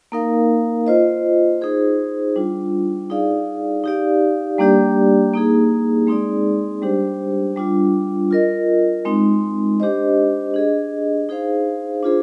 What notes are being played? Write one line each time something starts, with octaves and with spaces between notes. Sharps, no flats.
A#3 D#4 A#4 F5
F4 C5 D#5
D#4 G#4 C5
G3 D4 F4
D#4 G#4 D5 F5
D#4 G4 D5 F5
G3 A#3 D4 G4 D5
A#3 D#4 G#4
G#3 C4 D#4 G#4 D5
G3 D4 G4 C5
G3 D4 F4
F4 A#4 D#5
G#3 C4 D#4
D4 G4 C5 D#5
D4 G#4 D#5
D#4 G#4 C5 F5
D4 F4 G#4 C5